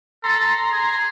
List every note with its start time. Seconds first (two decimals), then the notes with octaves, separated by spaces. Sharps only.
0.24 A4 A#5 C6
0.72 G#4